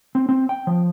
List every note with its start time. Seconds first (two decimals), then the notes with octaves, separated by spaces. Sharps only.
0.15 C4
0.29 C4
0.49 G5
0.67 F3